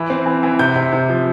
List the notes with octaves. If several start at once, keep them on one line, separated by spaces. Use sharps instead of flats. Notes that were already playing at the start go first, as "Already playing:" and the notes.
Already playing: E3
C4
E3
E3
C3 G6
C3
C3
F3